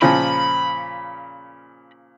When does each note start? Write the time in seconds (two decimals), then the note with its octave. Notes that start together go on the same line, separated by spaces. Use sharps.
0.02 A#2 C#3 F3 B5